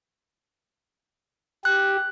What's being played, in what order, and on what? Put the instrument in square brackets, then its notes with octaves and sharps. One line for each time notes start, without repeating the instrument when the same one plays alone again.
[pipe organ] G4 [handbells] F#6